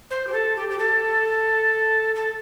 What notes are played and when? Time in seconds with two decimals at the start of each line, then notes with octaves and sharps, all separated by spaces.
0.10 C5
0.26 G4
0.32 A4
0.56 G4
0.69 G4
0.78 A4
2.15 A4